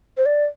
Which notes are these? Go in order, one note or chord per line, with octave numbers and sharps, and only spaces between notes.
C5
D5